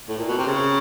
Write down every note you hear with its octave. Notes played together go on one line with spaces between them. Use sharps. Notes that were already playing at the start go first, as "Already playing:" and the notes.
A2
A#2
B2
C3
C#3